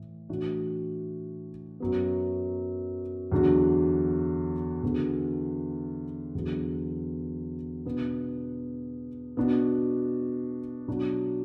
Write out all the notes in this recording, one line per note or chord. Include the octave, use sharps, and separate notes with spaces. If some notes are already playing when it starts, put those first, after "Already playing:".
Already playing: A2 E3
A2 E3 D4 F#4
F#2 F#3 B3
E2 D3 F#3 D4 F#4
E2 D3 B3 F#4
E2 D3 F#3 B3
B2 B3 D4
B2 B3 D4 F#4
B2 F#3 D4 F#4